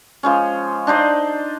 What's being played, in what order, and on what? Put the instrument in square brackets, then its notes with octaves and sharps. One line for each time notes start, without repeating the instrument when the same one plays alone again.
[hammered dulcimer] F3 G#3 C#4
D4 D#4 C5 D5